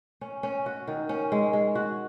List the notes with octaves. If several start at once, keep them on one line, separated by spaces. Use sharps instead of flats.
C#4
C#4
F#4
D#3
C#4
G#3
G#3
F#4